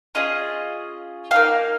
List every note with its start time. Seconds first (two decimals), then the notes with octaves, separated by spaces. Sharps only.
0.15 C#4 F4 G#4 D#5
1.31 A#3 D#4 G4 F5